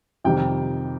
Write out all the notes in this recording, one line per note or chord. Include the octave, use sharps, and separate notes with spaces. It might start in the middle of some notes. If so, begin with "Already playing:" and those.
F2 C3 D#3 G3 G5